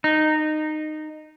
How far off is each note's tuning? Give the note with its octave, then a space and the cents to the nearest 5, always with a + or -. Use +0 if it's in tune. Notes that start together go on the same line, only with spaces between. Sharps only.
D#4 -15